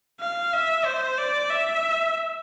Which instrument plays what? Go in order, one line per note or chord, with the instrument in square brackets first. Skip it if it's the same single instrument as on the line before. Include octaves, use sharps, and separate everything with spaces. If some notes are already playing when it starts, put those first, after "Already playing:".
[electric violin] F5
E5
C5
D5
E5